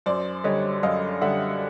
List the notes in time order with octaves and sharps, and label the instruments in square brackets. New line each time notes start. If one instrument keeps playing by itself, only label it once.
[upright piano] F#2 C5 D5
D3 G3 C#5 D#5
F#2 D#5 F5
D3 G3 E5 F#5